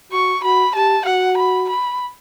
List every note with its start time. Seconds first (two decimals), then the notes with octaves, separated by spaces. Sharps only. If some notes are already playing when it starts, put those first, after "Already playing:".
0.11 F#4 C#6
0.43 F#4 B5
0.75 G4 A5
1.06 F#4 F#5
1.37 B5
1.69 B5